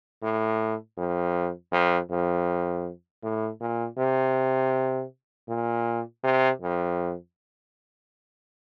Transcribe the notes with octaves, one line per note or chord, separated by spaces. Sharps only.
A2
F2
F2
F2
A2
A#2
C3
A#2
C3
F2